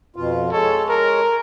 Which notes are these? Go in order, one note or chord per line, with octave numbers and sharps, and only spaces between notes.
F2 B2 F4
G#3 A4 C#5
A#4